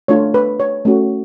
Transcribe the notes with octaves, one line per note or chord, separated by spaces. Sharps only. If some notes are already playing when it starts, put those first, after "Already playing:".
A3 D4 F4 C#5
B4
C#5
A3 C#4 F#4